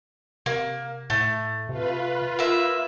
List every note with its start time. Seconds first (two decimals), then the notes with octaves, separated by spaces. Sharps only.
0.46 C3 A#3
1.10 A2 A3
1.69 C3 F4 B4
2.39 A#3 A#4 E5